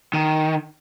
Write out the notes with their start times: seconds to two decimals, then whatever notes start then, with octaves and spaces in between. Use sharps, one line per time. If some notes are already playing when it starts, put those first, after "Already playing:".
0.14 D#3